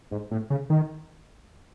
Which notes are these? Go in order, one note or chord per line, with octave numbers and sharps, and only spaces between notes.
G#2
A2
C#3
D#3